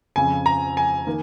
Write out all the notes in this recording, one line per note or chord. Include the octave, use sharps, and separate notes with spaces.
F2 C#3 F3 G#5
A#5
G#5
D#3 A#3